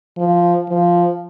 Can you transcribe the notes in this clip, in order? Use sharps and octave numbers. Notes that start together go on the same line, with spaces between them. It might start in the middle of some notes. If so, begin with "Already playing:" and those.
F3
F3